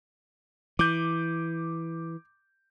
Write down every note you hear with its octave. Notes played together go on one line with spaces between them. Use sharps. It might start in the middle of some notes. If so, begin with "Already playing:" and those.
E3 D6 G6